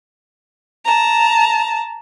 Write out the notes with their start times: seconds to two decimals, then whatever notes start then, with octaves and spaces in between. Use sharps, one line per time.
0.85 A5 A#5